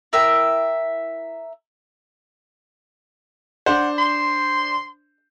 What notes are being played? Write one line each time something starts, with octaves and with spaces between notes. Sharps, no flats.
E4 A#4 E5 G5
D4 C5 F#5
C6